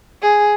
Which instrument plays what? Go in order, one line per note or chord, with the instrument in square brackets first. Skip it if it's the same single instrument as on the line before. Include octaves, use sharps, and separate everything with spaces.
[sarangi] G#4